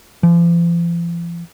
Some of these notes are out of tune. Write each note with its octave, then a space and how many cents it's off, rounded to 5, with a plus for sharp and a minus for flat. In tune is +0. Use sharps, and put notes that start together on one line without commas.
F3 -45